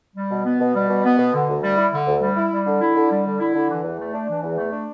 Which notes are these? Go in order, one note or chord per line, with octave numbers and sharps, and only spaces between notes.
G3
B2
B3
B2
G3
B2
B3
B2
D3
D2
G3
E4
D3
D2
G3
E4
G3
D3
E4
D3
G3
D3
E4
D3
E3
E2
A3
D4
E3
E2
A3
D4